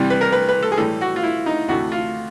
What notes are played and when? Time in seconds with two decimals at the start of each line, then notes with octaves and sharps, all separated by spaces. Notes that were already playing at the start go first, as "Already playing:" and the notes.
Already playing: C2 C3 E3 G3
0.10 B4
0.21 A#4
0.32 B4
0.49 B4
0.63 A4
0.72 G#4
0.78 A2 E3 G3 A4
1.01 F#4
1.16 F4
1.23 E4
1.46 D#4
1.68 D2 C3 E3 A3 F#4
1.92 F4